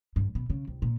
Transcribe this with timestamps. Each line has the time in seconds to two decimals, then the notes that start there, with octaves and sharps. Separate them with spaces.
0.16 G2
0.35 B2
0.50 C#3
0.68 C2
0.82 A#2